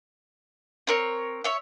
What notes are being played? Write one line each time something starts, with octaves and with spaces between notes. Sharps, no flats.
C4 A#4 C#5
C#5 E5